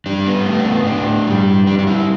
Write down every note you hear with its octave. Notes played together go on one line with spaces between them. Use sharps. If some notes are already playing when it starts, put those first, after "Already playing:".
G3 D4
B3
A2 A3
D4
B3
A2 D4
G3
G3 D4
D4
E4